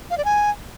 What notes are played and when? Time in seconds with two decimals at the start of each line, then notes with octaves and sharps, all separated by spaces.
0.11 F5
0.18 D5
0.25 G#5